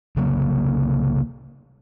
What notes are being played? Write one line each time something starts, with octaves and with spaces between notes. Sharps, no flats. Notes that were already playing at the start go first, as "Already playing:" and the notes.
C2 C#3 F#3 A#3